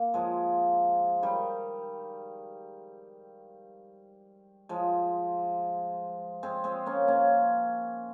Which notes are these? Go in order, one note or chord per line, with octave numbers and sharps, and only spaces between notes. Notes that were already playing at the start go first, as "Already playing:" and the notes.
Already playing: A#3
F3 G#3
D#3 G3
F3 G#3
G#3 C4
G#3 C4
A#3 C#4
A#3 C#4